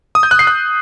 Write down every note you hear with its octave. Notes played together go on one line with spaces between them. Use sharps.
D#6
G6
F#6
C7
F#6